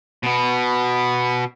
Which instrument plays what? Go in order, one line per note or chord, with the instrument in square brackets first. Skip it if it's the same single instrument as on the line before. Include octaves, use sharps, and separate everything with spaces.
[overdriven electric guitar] B2 B3